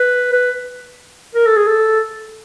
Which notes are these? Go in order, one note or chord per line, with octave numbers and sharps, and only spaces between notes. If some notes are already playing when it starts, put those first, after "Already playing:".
Already playing: B4
B4
A#4
A4
G#4
A4